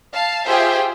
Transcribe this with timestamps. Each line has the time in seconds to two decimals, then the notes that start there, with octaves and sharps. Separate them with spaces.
0.13 F5 A5
0.46 F4 G4 G#4 C5 E5 G5